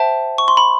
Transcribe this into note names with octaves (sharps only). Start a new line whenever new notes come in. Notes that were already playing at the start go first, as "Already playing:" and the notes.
Already playing: C5 E5 G5 A5
C#6
C6
B5